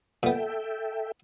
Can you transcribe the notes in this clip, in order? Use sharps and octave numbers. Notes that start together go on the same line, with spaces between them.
A#2 B3 A4 E5 G5